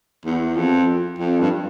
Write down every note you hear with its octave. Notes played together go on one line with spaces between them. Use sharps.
E2
F2
F2
G2